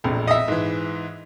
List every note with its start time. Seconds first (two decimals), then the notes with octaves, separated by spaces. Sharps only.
0.04 E1 A#1 F2
0.27 D#5 E5
0.48 G#2 E3